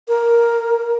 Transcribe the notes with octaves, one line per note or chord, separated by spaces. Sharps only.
A#4